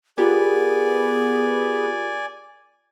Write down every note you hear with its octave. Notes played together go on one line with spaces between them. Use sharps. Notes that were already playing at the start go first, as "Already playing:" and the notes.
B3 F4 G4 G#4 A#4 D5 G#5